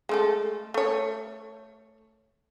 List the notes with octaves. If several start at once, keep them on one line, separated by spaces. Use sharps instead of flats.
G#3 A3 A4
A3 C#5